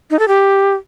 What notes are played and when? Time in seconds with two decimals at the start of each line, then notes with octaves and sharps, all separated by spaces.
0.11 D#4
0.19 A4
0.28 G4